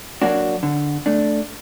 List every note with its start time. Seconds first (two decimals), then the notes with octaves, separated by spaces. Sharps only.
0.22 F#3 A#3 D4 F#4
0.63 D3
1.06 A3 D4